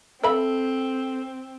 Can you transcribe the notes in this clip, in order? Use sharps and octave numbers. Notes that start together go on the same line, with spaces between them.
C4 A4 E5 B5